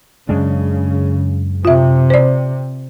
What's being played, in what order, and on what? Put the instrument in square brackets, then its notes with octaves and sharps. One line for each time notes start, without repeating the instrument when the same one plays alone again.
[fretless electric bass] F#2 G#3 D4 [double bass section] C#3
[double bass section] C3 [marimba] F4 E5
[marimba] C5 D5